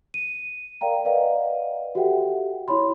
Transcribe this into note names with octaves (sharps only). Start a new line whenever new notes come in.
D#7
A#4 D5 F5 G5 A#5
B4 D5 D#5 F5 F#5
F#4 G4 A4 E5 F#5 G5
E4 F#4 C#5 B5 C6